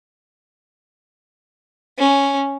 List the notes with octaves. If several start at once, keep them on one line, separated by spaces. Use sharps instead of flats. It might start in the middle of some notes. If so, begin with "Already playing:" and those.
C#4